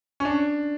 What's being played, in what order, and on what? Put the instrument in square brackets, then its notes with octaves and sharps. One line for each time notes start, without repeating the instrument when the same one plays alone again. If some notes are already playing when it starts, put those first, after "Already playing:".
[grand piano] C#4
D4